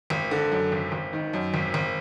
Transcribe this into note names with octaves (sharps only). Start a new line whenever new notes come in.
G#1
D3
F#2
G#1
G#1
D#3
F#2
G#1
G#1